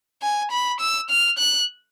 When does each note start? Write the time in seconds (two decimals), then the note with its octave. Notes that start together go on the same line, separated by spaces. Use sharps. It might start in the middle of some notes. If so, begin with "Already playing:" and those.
0.22 G#5
0.52 B5
0.80 E6
1.10 F6
1.38 F#6